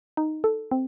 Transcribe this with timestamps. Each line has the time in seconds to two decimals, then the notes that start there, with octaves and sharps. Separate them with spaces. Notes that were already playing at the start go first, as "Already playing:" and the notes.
0.17 D#4
0.44 A4
0.71 C4